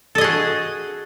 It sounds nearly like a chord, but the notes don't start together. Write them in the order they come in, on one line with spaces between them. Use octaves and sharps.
A4 D#5 G#4 F#4